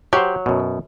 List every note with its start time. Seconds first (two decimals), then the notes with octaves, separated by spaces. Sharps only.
0.13 F#3 G4 C5
0.46 F#2 B2